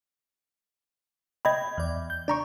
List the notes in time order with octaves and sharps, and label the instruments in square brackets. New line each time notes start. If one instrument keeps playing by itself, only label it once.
[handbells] D#5 B5 [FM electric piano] G5 G#6
[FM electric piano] E2 D5
G6
[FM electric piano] D4 [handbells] D5 A#5 C#6